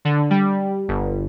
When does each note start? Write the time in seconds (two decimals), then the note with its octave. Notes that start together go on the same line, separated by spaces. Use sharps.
0.05 D3
0.30 G3
0.88 G1